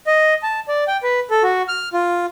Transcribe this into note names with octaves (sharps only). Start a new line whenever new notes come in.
D#5
A5
D5
G5
B4
A4
F#4
F6
F4